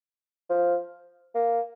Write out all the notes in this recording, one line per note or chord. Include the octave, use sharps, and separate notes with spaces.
F3
A#3